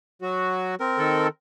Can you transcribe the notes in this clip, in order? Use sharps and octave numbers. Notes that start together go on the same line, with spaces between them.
F#3 F#4
C4 A#4
D#3 A4